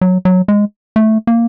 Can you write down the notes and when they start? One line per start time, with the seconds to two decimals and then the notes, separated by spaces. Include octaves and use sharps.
0.01 F#3
0.25 F#3
0.48 G#3
0.96 A3
1.27 A#3